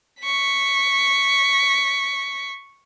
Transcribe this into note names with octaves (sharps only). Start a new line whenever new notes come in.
C#6 B6